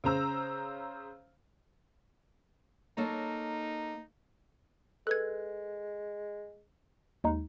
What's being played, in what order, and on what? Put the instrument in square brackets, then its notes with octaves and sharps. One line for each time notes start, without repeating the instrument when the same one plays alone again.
[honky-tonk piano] C#3 C5 A#5 E6
[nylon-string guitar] A#3 A4 C#5 [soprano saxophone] D#4
[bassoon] G#3 [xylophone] A4 B4 G#6 [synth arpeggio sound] F#6
[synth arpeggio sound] D#2 G#3 D#4